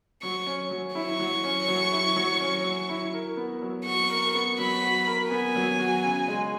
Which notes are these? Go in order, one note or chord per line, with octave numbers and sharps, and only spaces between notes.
F#3 C#6
C#4
F#3
E4 C#6
F#3
C#4
F#3
E4
F#3
C#4
F#3
E4
A#4
B3
F#3
F#4 C#6
A#4
B3
F#3 B5
F#4
A#4
B3 G#5
F#3
F#4
C#3
G#3